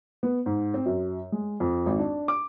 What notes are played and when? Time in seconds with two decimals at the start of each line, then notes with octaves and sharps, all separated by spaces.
0.23 B3
0.46 G#2
0.74 C4
0.86 F#2
1.32 G#3
1.60 F2
1.86 G#1
1.99 D4
2.28 D6